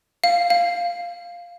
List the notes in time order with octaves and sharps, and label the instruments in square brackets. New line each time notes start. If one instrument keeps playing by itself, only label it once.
[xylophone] F5
F5